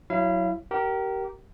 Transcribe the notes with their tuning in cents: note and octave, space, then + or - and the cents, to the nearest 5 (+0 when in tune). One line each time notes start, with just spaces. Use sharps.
F#3 +0 E4 +0 F5 -35
G4 -25 A#4 +0